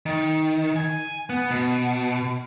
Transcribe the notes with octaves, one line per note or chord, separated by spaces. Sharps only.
D#3
G#5
B3
B2